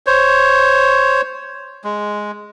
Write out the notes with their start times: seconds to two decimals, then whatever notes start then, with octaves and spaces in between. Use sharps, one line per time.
0.06 C5 C#5
1.84 G#3